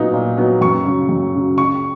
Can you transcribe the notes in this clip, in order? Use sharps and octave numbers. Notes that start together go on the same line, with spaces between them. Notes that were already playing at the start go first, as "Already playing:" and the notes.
Already playing: A#2 F#3 B3 D#4
A#2
F#3 B3 D#4
F#2 C#6
C#3 F#3
F#2
C#3 F#3
C#2 C#6